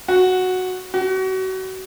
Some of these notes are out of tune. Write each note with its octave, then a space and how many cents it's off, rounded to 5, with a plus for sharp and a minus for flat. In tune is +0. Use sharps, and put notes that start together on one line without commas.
F#4 -5
F#4 +30